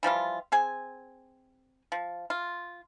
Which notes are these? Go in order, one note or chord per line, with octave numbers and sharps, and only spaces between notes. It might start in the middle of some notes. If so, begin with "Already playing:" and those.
E3 F3 G3 F4
C4 G#4 G#5
F3
F4